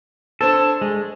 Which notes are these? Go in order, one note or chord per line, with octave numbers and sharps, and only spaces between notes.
D4 A4 C5 C#5
G#3